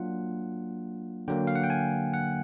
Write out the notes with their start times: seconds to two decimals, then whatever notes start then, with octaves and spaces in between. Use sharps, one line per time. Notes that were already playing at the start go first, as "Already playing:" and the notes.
Already playing: F#3 A#3 D4 F4 F#5
1.28 D3 F#3 A#3 G5
1.47 F5
1.55 F#5
1.64 G5
1.70 G#5
2.14 F#5